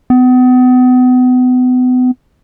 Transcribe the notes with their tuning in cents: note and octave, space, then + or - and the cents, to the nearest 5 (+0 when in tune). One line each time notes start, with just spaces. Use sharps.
B3 +35